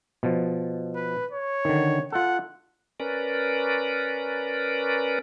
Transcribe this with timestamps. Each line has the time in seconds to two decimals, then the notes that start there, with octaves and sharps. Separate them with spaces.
0.23 B2 F3
0.96 B4
1.31 C#5
1.65 D3 D#3
2.12 F4 A4 F#5
3.00 C#4 A#4 B4 D5